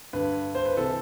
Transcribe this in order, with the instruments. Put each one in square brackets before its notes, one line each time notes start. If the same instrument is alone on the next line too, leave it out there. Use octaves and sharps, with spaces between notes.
[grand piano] G2 D3 B4
C5
B4
C3 E3 A4